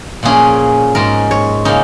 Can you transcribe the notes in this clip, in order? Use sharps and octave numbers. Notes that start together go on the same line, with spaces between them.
A#2 F3 A#3 C#4 G#4
G#2 G#3 C#4 A#4
C#5
C#3 A#3 C#4 D#4